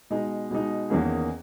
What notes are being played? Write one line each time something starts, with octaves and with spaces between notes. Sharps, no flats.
B2 G#3 D#4
B2 G#3 D#4
E2 D#3 A#3 C#4 G#4